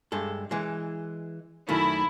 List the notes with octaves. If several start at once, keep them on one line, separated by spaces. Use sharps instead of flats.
G2 G#3 A4
E3 G#3
F#2 D#3 A3 E4